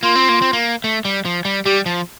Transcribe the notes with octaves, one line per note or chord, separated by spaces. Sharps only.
A#3 F4
C4
A#3
C4
A#3
A3
G3
F3
G3
G3 G4
F3